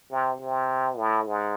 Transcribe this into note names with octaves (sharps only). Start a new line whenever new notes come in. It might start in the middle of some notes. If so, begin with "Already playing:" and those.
C3
C3
A2
G#2